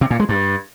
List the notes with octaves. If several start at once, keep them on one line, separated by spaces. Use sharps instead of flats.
C3
A#2
G#3
G2